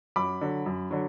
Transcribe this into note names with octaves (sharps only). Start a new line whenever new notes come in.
F#2 B5 D6
D3 F#3
F#2
D3 F#3